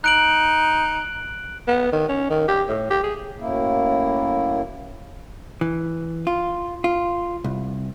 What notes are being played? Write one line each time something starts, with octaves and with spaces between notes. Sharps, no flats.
D#4 F#6 D7 F#7
B3
D#3
C#4
D#3
G4
A2
G4
G#4
F#2 A2 A#3 E4
E3
F4
F4
C2